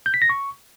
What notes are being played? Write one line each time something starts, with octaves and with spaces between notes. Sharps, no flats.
G6
B6
A#6
C#6